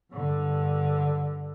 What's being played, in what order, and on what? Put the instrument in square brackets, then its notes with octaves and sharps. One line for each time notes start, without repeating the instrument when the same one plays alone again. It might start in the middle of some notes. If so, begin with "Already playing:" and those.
[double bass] G2 D3